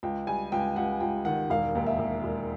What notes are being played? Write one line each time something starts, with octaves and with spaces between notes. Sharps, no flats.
C#2 G5
G3 G#5
C#2 G5
C#2 F#5
C#2 G5
D#3 F#5
E1 F5
D#2
E5
E1
E1